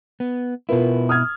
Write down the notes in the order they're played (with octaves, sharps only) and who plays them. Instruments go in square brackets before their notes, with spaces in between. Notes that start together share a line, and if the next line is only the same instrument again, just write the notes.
[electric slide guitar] B3
[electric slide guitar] B2 E4 [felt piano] F4 A#4 B4
[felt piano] D#6 F6 G#6